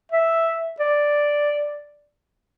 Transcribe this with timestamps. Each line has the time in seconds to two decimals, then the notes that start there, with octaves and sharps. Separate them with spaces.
0.12 E5
0.80 D5